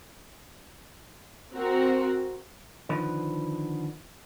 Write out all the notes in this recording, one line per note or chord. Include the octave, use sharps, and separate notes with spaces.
C4 F#4 A#4
D3 D#3 F3 B4